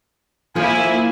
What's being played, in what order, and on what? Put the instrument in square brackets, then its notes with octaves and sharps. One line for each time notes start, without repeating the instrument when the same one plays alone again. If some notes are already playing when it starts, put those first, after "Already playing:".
[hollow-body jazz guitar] F3 [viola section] A#3 E4 [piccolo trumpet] G#5